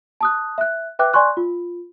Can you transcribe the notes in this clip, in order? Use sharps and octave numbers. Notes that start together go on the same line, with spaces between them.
A5 D#6 F#6
E5 F#6
B4 E5 G5 D6 F#6
D5 G#5 C6 C#6 F#6
F4